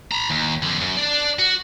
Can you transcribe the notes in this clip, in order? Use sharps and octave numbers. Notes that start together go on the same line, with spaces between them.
A#5 B5
D#2
F2 D3
F#2
D4 D5
F#4